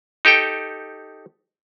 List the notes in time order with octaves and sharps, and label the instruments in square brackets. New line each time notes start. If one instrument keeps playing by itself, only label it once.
[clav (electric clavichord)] D#4 G4 A4 G5